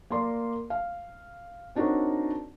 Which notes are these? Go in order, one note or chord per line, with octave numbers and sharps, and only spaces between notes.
A#3 A#4 D5 C6
F5
C4 D4 D#4 F#4 A#4 C#5